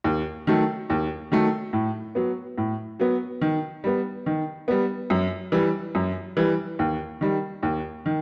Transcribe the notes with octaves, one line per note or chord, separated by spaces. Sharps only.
D#2
D#3 F#3 A3
D#2
D#3 F#3 A3
A2
F#3 B3
A2
F#3 B3
D#3
G3 B3
D#3
G3 B3
F#2
E3 G3
F#2
E3 G3
D#2
D#3 G3
D#2
D#3